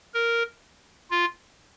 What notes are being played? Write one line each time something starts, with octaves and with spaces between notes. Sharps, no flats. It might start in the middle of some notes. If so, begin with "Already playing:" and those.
A#4
F4